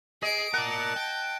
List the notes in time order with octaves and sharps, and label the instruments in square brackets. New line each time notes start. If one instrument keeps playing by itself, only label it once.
[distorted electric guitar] G#4 [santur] D#5 [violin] C7 D7
[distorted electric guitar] A#4 D5 [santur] F#5 [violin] A5
[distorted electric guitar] G5